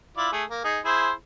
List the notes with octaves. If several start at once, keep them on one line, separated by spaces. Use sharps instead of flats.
E4 F4 D5
A3 G#4
A#3
D#4 G#4
E4 G#4 C5